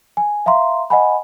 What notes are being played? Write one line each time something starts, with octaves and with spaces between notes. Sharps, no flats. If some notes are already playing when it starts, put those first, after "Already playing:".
G#5
E5 F5 A#5 C6
D#5 F#5 G#5 B5